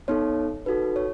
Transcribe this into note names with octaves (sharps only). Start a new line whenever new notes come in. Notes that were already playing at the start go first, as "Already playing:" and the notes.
B3 D#4 A4 C#5
D#4 F#4 A4 B4
C#5